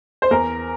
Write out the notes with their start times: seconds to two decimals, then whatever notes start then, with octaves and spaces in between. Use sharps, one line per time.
0.22 C5
0.31 E2 A#4